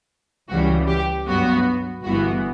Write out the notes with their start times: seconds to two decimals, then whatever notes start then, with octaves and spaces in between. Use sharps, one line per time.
0.48 C#2 C#3 E3 G3 F#4
0.87 G4
1.26 G2 F#3 B3 F#4
2.03 G1 G2 E3 B3 F#4